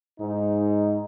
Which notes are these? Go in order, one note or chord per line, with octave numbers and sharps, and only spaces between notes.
G#2 D#4